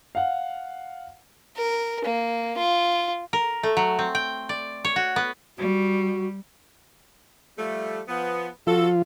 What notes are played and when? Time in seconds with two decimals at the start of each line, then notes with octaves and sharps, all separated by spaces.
0.15 F5 F#5
1.57 A#4
2.05 A#3
2.58 F4
3.33 A#4
3.63 A3
3.77 F#3
3.99 C4
4.15 G5
4.49 D5
4.85 C#5
4.96 F#4
5.16 B3
5.58 G3 F#4
7.57 F3 G3 A3
8.09 F3 B3
8.67 C3 F3 F4 F#4 A4